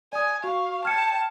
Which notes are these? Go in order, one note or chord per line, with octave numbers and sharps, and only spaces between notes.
D5 G#5 D#6
F#4 F5 C#6
G5 A5 F6 G#6 C#7